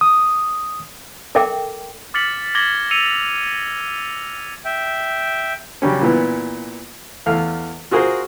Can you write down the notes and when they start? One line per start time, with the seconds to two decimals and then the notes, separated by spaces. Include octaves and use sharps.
0.01 D#6
1.35 A4 A#4 E5 G5 D6
2.14 D6 F6 A6 B6 C#7 F#7
2.55 D6 G#6 A#6 F#7 G7
2.91 E6 C#7 D#7 F7
4.65 E5 G5
5.82 C#3 F#3 G3 C#4
6.01 A#2 E3 B3
7.26 E2 A3 F5 F6
7.91 F4 F#4 G#4 A#4 C5